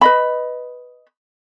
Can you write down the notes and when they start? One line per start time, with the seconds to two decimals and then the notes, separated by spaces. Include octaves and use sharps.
0.01 B4 D#5 B5